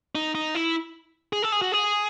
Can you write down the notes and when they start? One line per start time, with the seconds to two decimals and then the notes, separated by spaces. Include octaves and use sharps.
0.15 D#4
0.35 D#4
0.55 E4
1.33 G#4
1.42 A4
1.52 G#4
1.62 F#4
1.72 G#4